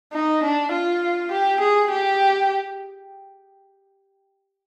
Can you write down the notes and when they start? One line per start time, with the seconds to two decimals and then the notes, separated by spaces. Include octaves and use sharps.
0.13 D#4
0.43 D4
0.72 F4
1.31 G4
1.61 G#4
1.91 G4